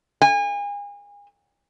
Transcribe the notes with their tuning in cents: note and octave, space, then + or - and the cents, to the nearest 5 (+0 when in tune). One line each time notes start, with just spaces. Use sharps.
G#5 -35